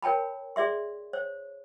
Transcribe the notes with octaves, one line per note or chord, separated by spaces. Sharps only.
A#4 C#5 G5 A5 B5
G#4 D5 E5 C6
C5 C#5